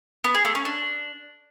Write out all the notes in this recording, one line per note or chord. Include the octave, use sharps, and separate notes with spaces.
B3
G#4
A3
C#4
D4